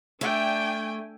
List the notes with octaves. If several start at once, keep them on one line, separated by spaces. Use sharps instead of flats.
A3 D4 G5 G#5